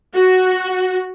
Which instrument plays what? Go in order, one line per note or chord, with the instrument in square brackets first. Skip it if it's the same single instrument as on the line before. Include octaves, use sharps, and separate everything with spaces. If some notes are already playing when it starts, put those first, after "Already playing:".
[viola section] F#4